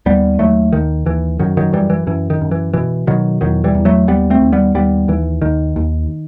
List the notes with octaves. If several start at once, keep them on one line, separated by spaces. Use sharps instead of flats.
D#2 G3 B3
D#2 F#3 A3
D#2 D#3
D#2 E3
F#2 D#3 F#3
D#3 F#3
F#2 E3 G3
E3
F#2 E3
D#3
F#2
E3
B2 E3
B2 D#3 F#3
E2 D#3 F#3
E3 G3
E2
F#3 A3
D#2 G3 B3
A3 C4
D#2
G3 B3
D#2 G3 B3
D#2 E3
D#2 D#3
D#2